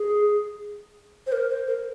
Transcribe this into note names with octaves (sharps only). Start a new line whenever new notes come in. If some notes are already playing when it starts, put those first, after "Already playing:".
Already playing: G#4
C5
A#4
C5
A#4